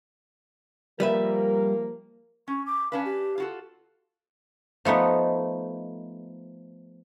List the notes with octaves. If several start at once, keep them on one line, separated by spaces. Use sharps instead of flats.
F3 G3 A#3 A#4 B4 E5
C#4 C#6
D6
C#4 D4 B4 F5
G4
F4 F#4 A4
F3 A3 B3 D#4